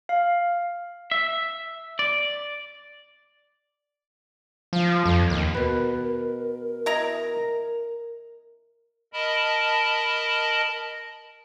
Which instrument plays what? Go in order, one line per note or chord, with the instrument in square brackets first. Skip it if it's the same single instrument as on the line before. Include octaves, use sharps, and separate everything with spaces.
[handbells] F5
[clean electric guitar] E5
D5
[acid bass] F3
F2
D#2
[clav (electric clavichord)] B2 B4 [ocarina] A#4
[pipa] E4 D#5 A#5
[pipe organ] A#4 D#5 A5 B5